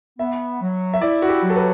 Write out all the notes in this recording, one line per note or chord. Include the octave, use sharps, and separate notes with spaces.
B3 E5
F#3
E5
E4 D5
F#4
G4
F#3
A4
B4